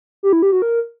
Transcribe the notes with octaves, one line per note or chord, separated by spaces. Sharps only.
G4
E4
G4
F#4
A#4